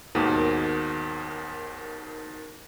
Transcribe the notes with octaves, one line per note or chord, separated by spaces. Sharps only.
D#2 G#2 B2 D#3